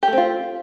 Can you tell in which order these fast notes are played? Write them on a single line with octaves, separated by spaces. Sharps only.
G4 A3 C4 F4